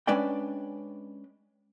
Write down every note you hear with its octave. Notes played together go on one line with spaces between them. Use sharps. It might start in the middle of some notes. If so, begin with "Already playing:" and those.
G#3 C#4 D4 B4 D5 G5